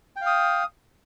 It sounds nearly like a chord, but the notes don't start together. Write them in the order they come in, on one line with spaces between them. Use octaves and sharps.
G5 F5 D#6